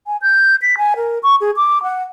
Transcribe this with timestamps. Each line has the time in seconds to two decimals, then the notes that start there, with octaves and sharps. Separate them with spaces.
0.06 G#5
0.22 G6
0.62 B6
0.78 G#5
0.96 A#4
1.23 C#6
1.41 G#4
1.57 D6
1.83 F#5